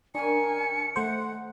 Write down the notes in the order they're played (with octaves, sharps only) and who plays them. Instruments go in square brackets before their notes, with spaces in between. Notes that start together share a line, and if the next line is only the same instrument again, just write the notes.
[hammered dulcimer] D#3 C#4 [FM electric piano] D4 [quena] G#5 [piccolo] C#7
[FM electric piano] A3 C5 [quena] F#5